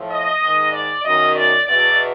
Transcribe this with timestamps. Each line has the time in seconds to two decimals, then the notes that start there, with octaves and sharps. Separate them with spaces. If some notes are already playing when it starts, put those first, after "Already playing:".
Already playing: A2 F3
0.10 D#5
0.41 G#2 D#3
0.72 D5
1.03 F#2 D#3 D#5
1.35 D5
1.66 E2 B2 D5